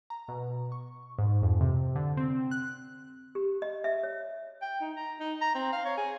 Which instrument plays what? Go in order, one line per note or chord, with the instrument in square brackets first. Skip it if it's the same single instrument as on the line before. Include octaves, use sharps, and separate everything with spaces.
[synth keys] A#5
B2
C#6
G#2
F2
C3
D3
C4
F#6
[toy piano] G4
D#5
E5
C#5
[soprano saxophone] G5
D#4
A#5
D#4
A#5
C4
F5
C#5
G#4